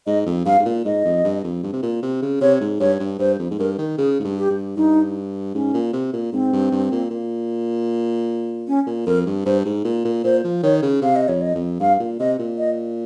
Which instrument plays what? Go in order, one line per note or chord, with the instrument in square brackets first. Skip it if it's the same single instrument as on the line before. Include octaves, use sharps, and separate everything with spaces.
[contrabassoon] G#2 [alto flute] D#5
[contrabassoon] F2
[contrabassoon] G2 [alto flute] F5
[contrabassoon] G#2
A#2
[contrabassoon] G#2 [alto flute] D#5
[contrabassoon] F2
G2
F2
G2
C3
A#2
C3
C#3
[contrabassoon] C3 [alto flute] C#5
[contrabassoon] G#2
[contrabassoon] G2 [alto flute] C#5
[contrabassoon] G2
[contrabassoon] G2 [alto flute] C5
[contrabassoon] F2
G#2
[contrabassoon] G2 [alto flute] A#4
[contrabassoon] D#3
[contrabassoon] C#3 [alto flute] G#4
[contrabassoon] G#2
G2
[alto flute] G4
[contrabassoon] G2
[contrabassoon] G2 [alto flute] D#4
[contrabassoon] G#2 [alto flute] C#4
[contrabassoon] A#2
C3
A#2
[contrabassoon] G#2 [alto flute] C4
[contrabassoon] G2
G2
A#2
A#2
[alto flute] C#4
[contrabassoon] A#2
[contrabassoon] F2 [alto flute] A#4
[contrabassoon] G2
[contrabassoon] G2 [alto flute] C5
[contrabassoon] G#2
A#2
A#2
[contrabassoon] A#2 [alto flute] C5
[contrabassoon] F3
[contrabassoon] D#3 [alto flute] C#5
[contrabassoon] C#3
[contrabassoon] C3 [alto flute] F5
[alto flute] D#5
[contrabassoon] F2 [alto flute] C#5
[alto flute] D#5
[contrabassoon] F2
[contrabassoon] G2 [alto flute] F5
[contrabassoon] A#2
[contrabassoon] C3 [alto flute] D#5
[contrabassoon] A#2
[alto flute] D#5